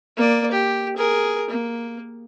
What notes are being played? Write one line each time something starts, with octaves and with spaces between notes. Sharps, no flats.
A#3 D5
G4
G#4 A#4
A#3